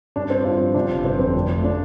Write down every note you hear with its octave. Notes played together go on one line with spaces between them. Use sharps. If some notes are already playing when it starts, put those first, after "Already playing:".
G2 D4
C4 D4
G2 F4
F3
C3 D4
G1
C3 C4
F2 C4
F1
A3
F3 D4